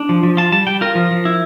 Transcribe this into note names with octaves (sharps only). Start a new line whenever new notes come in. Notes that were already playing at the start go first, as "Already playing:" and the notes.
Already playing: D4
F3
F3
F4 A5
G3 A5
G3 G5
F4 A#4
F3
F3
E4